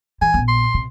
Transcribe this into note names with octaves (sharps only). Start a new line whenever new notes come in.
E3 G#5
A#1 B3
C6
C3